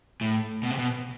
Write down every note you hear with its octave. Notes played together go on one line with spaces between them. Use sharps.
A2
B2
C3
B2